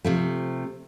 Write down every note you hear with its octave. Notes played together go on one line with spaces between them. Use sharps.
C3 F3 A3